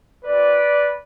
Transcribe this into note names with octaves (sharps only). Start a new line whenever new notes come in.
C4 F4 B4 D5